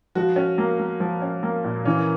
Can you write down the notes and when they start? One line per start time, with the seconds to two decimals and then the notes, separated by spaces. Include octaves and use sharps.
0.15 F3 F#4
0.36 C#4
0.58 A#3
0.80 A#3
1.00 F3
1.22 C#4
1.43 A#3
1.64 A#2
1.85 E3 C#4